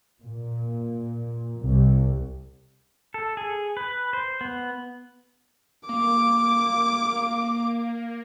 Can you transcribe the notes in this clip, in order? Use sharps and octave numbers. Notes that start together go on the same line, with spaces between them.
A#2
C2
A4
G#4
B4
C5
B3
A#3 D6